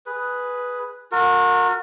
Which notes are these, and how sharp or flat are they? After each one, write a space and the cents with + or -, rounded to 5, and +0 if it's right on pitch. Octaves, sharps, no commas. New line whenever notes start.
G#4 +0 B4 +0
F#4 -35 A#4 -20